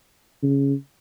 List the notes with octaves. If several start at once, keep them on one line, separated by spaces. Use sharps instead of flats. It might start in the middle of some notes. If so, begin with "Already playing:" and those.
C#3